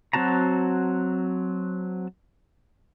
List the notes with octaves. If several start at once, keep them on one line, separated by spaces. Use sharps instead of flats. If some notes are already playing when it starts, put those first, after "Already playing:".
F#3 C4 F#4 A5 A#5